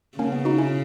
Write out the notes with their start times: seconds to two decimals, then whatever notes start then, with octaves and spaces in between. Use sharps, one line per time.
0.18 C#3 A#3 C#4
0.32 B3
0.45 D#4 F#4
0.58 C#4 E4